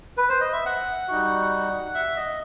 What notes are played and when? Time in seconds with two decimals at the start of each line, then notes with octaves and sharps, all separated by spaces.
0.17 B4
0.29 C5
0.41 D#5
0.53 E5
0.65 F#5
1.08 G3 D#4 F#4
1.95 E5
2.17 D#5